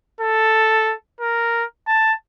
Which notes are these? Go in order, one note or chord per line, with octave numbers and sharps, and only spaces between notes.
A4
A#4
A5